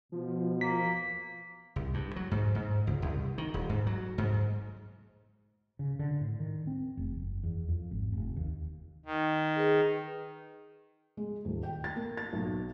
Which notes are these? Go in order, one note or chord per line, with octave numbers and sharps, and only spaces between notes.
B2 F3
A#3 B6
C2
G2
F#3
G#2
G#2
C#2
C2
D#3
D#1
G#2
F#3
G#2
C#3
D3
A2
D#3
C4
F1
F#1
E2
F2
G#1
F1
D#2
D#3
G#4 B4
G#3
D#1
G5
A6
A#3
A6
B1